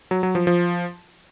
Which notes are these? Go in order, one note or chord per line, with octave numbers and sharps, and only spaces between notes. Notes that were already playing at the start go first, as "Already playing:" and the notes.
F#3
F#3
F3
F3